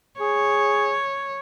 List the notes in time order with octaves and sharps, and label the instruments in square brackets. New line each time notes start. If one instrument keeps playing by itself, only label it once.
[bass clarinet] G#4 [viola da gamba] C#5